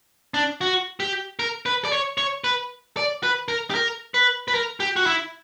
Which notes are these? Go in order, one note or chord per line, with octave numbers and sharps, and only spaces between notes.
D4
F#4
G4
A#4
B4
D5
C#5
C#5
B4
D5
B4
A#4
G4
A#4
B4
B4
A#4
G4
F#4
E4